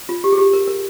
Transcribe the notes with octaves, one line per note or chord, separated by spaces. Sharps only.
F4
G4
G#4
G4
A#4
A#4